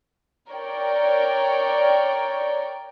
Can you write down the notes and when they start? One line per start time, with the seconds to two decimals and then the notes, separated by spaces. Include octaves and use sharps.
0.50 A#4 C#5 D5 G5